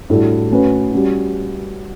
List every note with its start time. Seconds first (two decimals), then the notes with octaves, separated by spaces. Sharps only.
0.10 A2 G3 D4 F#4 A4
0.51 A3 C#4 F#4 B4
0.92 G3 C#4 F#4